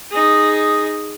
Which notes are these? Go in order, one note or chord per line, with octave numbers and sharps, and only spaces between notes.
D#4 G#4